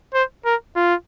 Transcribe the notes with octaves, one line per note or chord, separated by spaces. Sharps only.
C5
A#4
F4